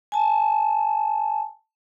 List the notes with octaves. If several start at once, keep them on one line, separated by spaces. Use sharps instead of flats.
G#5 A5